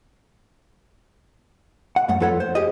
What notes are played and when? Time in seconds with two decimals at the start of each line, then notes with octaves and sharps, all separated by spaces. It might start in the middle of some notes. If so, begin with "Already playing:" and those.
1.96 F#5
2.09 F#2 A3 F#5
2.20 F2 F4 A4 B4 C#5 F#5
2.40 C5
2.55 G4 G#4 D#5